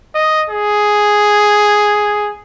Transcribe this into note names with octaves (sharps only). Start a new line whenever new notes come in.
D#5
G#4